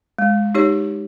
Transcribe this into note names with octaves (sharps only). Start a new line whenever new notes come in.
G#3
D#4 G4 C#5